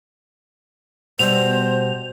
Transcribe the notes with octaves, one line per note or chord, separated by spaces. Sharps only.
B2 G3 C5 F7